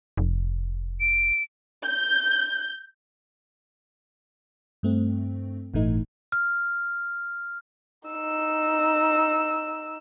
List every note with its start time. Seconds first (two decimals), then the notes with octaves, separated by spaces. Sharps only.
0.17 F1
1.00 D7
1.85 G6
4.83 G2 A3 C4
5.74 G1 A2 E3 A3 D#4
6.32 F6
8.08 D#4 E6